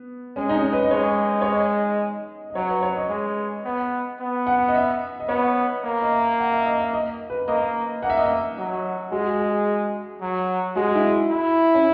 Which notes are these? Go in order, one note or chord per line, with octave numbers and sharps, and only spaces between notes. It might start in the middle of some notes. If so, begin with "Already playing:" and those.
Already playing: B3
G#3 C#4
D#4
C#4
B4
D#5
G#3 C#5
C#5
D#5
D#5
F#3 C#5
B4
C#5
D#5
G#3
B3
B3
F#5
D#5
E5
D#5
B3 C#5
A#3
D#5
E5
F#5
E5
D#5
E5
D#5
B4
A#3 D#5
A#3 F#5
E5
D#5
E5
F#3
G#3 F#4
G#4
F#3
G#3 F#4
E4
E4
C#4